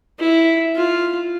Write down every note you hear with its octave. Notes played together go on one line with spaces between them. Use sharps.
E4
F4